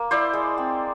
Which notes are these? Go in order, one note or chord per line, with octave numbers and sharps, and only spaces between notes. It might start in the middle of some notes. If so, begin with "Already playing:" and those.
Already playing: A#3
E4 C5 D5
G#3
C4